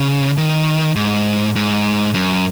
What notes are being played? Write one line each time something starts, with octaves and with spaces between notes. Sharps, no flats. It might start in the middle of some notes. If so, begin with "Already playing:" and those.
Already playing: C#3
D#3
G#2
G#2
F#2